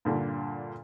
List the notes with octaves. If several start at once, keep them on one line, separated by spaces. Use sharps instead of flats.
G2 A#2 D3